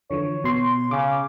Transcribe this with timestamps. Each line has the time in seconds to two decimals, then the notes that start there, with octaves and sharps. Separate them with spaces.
0.11 D3 E3 F3 C#5
0.44 B2 C6
0.91 C#3 D6